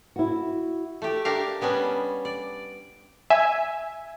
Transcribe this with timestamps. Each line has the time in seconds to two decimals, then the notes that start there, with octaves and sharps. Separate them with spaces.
0.16 E4 F#4
1.02 A3 G4
1.25 D4 G4 A#4 F5
1.61 G3 B3 C#4 D4
2.25 D5
3.30 E5 G#5